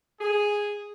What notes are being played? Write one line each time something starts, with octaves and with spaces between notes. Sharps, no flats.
G#4